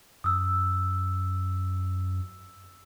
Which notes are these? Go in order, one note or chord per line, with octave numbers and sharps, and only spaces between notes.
F#2 D#6 E6